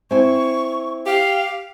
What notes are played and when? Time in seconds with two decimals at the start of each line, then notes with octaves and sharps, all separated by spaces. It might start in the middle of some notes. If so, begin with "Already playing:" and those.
0.11 C4 E4 G#5 C#6
1.06 G4 F5